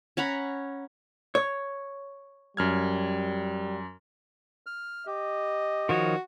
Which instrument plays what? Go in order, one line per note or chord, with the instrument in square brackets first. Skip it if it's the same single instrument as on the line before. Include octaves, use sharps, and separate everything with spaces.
[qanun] C#4 F#5 A#5 B5
[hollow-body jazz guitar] C#5
[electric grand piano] F#2 F6 G#6 [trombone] G3
[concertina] F6
[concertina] G4 [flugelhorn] D#5
[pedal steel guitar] D#3 F3 C#5 [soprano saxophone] F#4